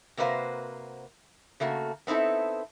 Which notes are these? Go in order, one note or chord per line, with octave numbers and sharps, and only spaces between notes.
C3 A#3 F#4 B4 C5 F5
C#3 A3 A#3 F#4
B3 C4 D#4 E4 A4